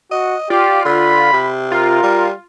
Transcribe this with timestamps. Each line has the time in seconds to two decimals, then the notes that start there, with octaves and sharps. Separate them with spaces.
0.12 F#4 D#5
0.50 F4 G4 D5
0.85 D3 B5
1.33 C3
1.72 F4 A#4
2.03 G3